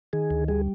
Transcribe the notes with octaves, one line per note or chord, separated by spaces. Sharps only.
D#3 G#4
D2
G3 G#4